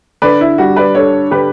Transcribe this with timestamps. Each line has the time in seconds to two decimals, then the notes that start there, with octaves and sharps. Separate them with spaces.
0.22 D3 B4 D5
0.41 E4
0.58 G3 F#4
0.76 B4 D5
0.95 D4 A4 C#5
1.31 D3 G4 B4